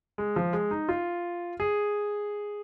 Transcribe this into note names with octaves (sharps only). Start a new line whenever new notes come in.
G#3
F3
G#3
D#4
F4
G#4